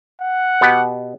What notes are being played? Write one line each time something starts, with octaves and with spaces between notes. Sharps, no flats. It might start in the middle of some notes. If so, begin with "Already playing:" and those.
F#5
B2 B3 G4